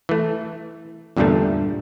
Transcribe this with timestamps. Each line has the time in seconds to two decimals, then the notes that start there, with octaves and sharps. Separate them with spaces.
0.09 E3 A3
1.17 E2 G2 A#2 D3 G3 A3